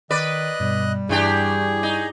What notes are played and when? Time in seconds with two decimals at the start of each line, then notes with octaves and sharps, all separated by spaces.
0.11 D#3 B4 D5 D#5 F#6
0.60 G2 B2 G3
1.09 G2 E3 D4 E4 G4 G#4 C#6
1.83 D#4